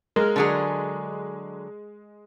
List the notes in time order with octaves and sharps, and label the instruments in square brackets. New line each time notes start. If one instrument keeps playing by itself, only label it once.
[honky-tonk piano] G#3 [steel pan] A#4
[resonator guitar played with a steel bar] D3 F#3 G#4